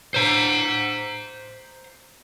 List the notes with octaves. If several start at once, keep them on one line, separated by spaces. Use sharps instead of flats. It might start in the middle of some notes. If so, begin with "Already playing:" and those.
C5 A#5